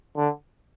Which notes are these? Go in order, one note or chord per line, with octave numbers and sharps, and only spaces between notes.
D3